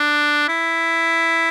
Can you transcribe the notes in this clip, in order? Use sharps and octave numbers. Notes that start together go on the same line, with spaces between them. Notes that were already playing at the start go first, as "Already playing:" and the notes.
Already playing: D4
E4